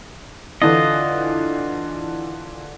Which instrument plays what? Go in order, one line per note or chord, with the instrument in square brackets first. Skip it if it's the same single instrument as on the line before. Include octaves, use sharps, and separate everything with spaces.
[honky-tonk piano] D3 E3 D4 [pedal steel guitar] F4 D#5